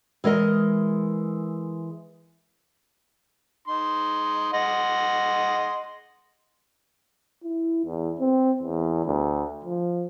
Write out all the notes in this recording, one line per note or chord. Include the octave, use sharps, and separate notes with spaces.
E3 G#3 A#4 D#5
D#4 C6
D#5 F#5 C6
E4
E2
C4
E2
D2
F3